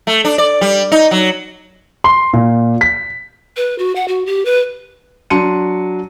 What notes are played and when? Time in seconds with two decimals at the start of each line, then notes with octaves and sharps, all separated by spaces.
0.07 A3
0.25 D4
0.38 D5
0.61 G3
0.92 D#4
1.11 F#3
2.04 C6
2.33 A#2
2.81 B6
3.57 B4
3.78 F#4
3.96 F#5
4.08 F#4
4.26 G4
4.45 B4
5.30 F#3 D4 C6 C#7 D#7